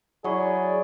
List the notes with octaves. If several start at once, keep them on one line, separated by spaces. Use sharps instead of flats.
F#3 E4 G#4 D5 F#5 C#6